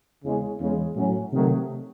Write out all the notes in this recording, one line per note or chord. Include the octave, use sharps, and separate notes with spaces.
E2 C#3 G#3 C#4
E2 C#3 G#3 C#4
A2 F#3 C#4
C3 D#3 F#3 A3